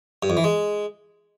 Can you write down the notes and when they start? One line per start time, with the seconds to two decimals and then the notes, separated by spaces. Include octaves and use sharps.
0.23 G2
0.30 F2
0.37 E3
0.44 G#3